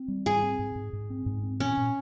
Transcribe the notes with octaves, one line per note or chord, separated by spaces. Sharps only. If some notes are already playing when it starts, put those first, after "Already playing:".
Already playing: C4
G3
G#2 G#4
C4
G#2
G#2
G#2
C4
G#2
C4
A#2 C#4
A#2